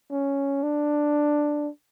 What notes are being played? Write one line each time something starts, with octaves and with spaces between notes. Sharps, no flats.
C#4
D4